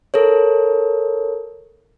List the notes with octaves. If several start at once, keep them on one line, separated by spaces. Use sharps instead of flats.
A4 A#4 C#5